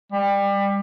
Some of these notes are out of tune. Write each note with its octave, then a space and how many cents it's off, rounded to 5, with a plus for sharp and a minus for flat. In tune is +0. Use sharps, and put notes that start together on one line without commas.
G3 +25